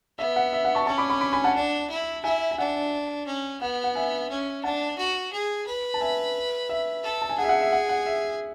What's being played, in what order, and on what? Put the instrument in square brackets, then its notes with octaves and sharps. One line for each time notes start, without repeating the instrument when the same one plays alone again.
[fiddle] B3 [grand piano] E5
[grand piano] F#5
E5
F#5
A5 C#6
[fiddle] C#4 [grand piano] A5 C#6
[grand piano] B5 D6
B5 D6
B5 D6
G#5 B5
F#5 A5
[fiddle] D4
E4
[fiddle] E4 [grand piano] E5 G#5
[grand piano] G#5
[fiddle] D4 [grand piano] F#5
[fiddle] C#4
[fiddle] B3 [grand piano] F#5
[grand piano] F#5
E5 G#5
[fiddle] C#4
[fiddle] D4 [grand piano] F#5 A5
[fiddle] F#4
G#4
B4
[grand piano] A5
E5 G#5
E5
[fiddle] A4
[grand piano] A5
G#5
[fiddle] G#4 [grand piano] F#5
[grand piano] E5
F#5
E5
F#5
F#5
E5